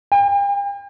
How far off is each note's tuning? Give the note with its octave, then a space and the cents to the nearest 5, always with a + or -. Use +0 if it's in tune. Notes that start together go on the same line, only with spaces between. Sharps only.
G5 +40